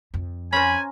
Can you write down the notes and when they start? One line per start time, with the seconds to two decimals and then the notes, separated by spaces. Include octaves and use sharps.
0.14 F2
0.53 C#4 A#4 C5 G#5 B5